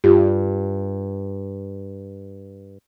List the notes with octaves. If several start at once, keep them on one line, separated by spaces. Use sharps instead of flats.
G2 F4 G4